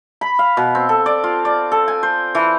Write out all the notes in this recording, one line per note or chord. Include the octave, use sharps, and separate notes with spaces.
B5
F5
B2
C4
A4
D5
F4
D5
A4
G#5
C5
E3